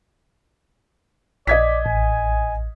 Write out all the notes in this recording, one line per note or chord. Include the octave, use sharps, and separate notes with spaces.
A#1 D5 D#5 G#6 B6
A1 G#5